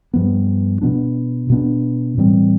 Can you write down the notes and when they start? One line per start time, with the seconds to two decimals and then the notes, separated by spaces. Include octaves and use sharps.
0.14 G2 F3 B3
0.81 B2 B3 D4
1.50 B2 B3 D4
2.18 A2 E3 G3 C4